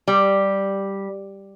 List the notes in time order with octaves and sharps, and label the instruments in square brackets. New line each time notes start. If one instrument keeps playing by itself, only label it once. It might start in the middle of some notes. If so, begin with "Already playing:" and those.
[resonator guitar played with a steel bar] G3